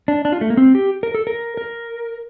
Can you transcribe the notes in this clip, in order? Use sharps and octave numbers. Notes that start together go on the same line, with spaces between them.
D4
D4
F4
A3
A#3
C4
G4
A#4
A4
A#4
A#4